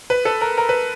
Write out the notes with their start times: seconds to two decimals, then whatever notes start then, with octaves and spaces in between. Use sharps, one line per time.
0.10 B4
0.25 A4
0.41 A#4
0.58 A#4
0.69 B4